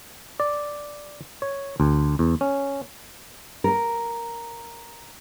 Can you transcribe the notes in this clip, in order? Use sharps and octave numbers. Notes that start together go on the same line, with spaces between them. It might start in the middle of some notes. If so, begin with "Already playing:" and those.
D5
C#5
D2
E2
C#4
A#4